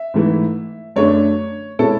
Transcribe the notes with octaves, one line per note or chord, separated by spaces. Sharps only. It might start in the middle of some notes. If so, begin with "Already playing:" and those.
Already playing: E5
G#2 E3 A3 E4
F#2 D3 A3 D4 C#5
B2 G#3 C#4 E4 A4